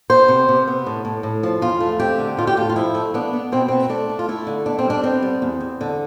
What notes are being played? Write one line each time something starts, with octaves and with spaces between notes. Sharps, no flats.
B3 C5
C3
C3
B3
A2
A2
A2
F3
E2 F4
A3
C4 G4
D3
A2 F4
G4
A2 F4
F4
F3 E4
A3
B3 D4
B3
B2 C4
B3 C4
A3 D4
A3
F4
A3 E4
D3
B3 D4
C4
G3
D4
B3 C4
G3
E2
E2
D3